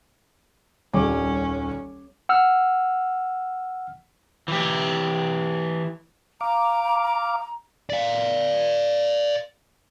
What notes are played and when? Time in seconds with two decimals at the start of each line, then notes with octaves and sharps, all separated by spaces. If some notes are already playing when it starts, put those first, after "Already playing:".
0.94 D#1 C2 C#4 D6
2.29 F#5 E6 F6
4.48 E3 G4
6.41 F5 A#5 D6
7.90 D5 F5